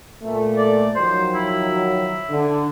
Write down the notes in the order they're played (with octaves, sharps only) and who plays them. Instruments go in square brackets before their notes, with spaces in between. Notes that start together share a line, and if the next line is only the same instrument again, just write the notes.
[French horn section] A#2 A3
[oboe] D5
[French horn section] D#3 F3 F#3 [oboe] C5
[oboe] E4
[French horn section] D3